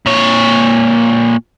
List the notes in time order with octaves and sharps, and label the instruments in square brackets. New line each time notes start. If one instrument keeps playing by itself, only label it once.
[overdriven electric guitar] A#2 C#5